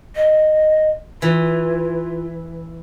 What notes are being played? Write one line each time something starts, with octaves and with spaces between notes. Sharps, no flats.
D#5
E3 F4